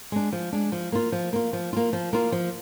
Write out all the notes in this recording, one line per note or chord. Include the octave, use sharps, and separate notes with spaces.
G#3 D4
F3
G#3 D4
F3
A#3 F4
F3
A#3 F4
F3
A#3 F4
F3
A#3 F4
F3